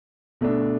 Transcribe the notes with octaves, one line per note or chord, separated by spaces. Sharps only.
B2 A3 D4